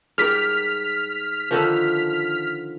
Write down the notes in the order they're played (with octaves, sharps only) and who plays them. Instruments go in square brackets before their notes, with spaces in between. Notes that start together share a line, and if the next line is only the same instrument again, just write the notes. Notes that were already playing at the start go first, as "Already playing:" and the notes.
[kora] G#2 G3 A#4 [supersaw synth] F6 B6
[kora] D3 D#3 F3